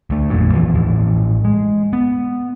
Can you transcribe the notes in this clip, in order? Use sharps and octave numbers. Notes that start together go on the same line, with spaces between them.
D2 A3
G#1 F2 A#2 F#3
D#2 E3 F3
A1 A2 E3 F3
G#3
B3